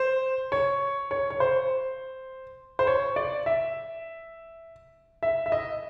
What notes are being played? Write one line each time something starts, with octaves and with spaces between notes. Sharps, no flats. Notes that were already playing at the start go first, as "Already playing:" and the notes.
Already playing: C5
C#5
C#5
C#5
C5
C5
C#5
D5
E5
E5
E5
D#5